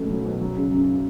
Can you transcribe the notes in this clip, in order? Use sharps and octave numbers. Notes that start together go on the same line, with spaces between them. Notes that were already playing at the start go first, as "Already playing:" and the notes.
Already playing: C#2 B2 F#3 A3
F#3
B2
F#3
C#3
F#2